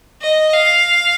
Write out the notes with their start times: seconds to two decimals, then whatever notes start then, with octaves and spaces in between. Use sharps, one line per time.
0.22 D#5
0.54 F5